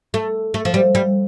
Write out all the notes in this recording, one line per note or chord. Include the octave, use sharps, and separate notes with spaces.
A3
A3
F3
G3
G3